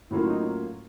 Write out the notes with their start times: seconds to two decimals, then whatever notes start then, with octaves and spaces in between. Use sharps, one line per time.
0.11 A2 F#3 A#3 C#4 E4 F4
0.27 D#4